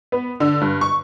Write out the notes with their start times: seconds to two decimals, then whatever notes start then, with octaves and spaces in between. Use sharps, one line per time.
0.12 B3
0.40 D3
0.61 G2
0.81 C#6